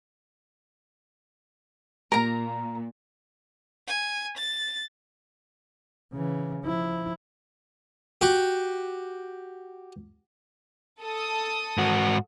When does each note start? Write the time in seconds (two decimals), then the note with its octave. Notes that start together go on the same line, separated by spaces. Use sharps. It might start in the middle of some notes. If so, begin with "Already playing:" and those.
2.12 A#2 A#4 A#5
3.88 G#5
4.37 A6
6.13 C#3 E3
6.64 F3 E4
8.21 F#4 G4
11.01 A4 D#6
11.77 G#2 F#4